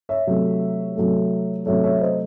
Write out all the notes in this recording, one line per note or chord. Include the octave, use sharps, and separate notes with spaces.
C#5 E5
C3 F#3 A3
C3 F#3 A3
C3 F#3 A3 C#5 E5
C#5 E5
C5 D#5